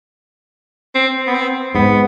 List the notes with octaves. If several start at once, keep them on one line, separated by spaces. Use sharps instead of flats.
C4
B3
C4
G#2 B3